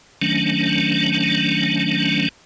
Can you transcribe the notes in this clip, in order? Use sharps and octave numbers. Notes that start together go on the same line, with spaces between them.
D#3 F#3 A3 C#4 D4